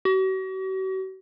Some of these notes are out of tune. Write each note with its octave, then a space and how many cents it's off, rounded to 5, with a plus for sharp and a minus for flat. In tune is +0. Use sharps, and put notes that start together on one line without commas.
F#4 +45